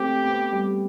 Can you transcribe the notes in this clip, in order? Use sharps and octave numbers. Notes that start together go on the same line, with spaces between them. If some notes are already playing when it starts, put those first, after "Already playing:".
Already playing: A3 C4 G4
B3
G3